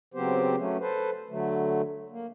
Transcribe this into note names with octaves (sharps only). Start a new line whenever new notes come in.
C#3 F#3 B3 C4 G4 C5
F#3 A3 C#4
A4 B4 C5
D3 F#3 A3
A#3